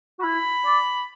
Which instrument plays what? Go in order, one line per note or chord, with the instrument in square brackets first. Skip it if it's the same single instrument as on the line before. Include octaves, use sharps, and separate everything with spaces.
[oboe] F#4
[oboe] E4 [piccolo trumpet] B5
[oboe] D5